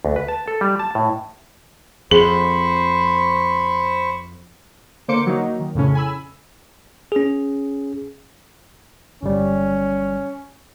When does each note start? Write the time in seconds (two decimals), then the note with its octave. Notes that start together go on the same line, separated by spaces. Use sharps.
0.05 D2
0.16 B4
0.28 A5
0.48 A4
0.61 G3
0.80 A5
0.95 A2
2.11 F2 G#4 C5 B5 C#6
5.08 D3 A#3 C5 C6 D6 C#7
5.27 F#3 A#3 D#4
5.60 D#3
5.75 F2 A2 C#3 C#4
5.95 G#5 B5 E6
7.12 C#4 G#4
9.23 G1 G3 C#4